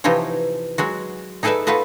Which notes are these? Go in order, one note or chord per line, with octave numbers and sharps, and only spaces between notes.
C3 E3 F3 D#4 F4 C#5
F#3 G#3 F#4
D#4 G#4 A4 B4 D5 E5
A3 B3 F4 B4 D#5